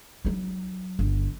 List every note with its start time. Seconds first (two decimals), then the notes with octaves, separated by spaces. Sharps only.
0.25 F#3 D#4
0.99 G1